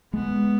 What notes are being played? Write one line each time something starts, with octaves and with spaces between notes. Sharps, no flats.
G#3 B3